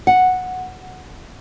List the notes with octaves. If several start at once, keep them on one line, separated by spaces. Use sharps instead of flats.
F#5